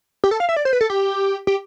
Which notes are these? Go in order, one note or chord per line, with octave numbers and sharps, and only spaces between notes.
G4
A4
F5
E5
D5
C5
B4
A4
G4
G4